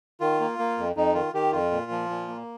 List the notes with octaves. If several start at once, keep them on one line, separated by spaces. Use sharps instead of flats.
D#3 F4
A#3
A#3
F2
F2 D#4
D#3 F4
D#3 G4
F2 F4
A#2
F3
A#2
A#3